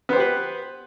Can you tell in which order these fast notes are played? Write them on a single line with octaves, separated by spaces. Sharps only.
B3 C5 G4 B4